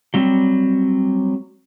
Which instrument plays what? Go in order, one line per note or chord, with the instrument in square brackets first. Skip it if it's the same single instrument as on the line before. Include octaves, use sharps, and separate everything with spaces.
[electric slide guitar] F#3 G3 C4